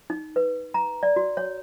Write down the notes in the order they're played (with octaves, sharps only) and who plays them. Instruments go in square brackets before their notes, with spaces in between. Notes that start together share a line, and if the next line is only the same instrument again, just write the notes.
[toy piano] D#4
B4
A#5
D5
F#4
C#5